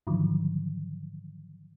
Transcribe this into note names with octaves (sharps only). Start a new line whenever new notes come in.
G#2 D3 D#3 F3 F#3